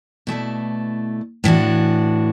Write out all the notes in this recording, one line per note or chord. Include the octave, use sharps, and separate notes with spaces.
B2 A3 E4 D5
A2 E3 D4 F#4